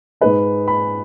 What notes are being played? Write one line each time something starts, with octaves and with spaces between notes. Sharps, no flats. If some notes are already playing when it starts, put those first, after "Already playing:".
G#2 G#3 D#4 B4
B5